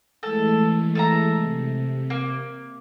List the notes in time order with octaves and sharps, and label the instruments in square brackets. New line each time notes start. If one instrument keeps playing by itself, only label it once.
[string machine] E3 G#3 A3 [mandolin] A4
[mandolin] A4 E5 A#5
[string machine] C3
[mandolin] A#3